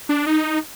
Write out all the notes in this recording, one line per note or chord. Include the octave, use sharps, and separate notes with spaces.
D4
D#4